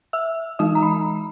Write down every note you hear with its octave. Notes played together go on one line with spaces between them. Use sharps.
E5 E6
E3 G#3 D#4 D#5 D#6
A#5
B5